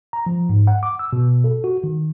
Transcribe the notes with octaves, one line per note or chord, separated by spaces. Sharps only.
A#5
F3
G#2
F#5
D6
E6
B2
A4
F#4
D#3